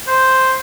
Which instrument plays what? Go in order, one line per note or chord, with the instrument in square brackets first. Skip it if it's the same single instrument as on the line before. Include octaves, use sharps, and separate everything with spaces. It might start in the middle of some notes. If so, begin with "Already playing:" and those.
[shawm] C5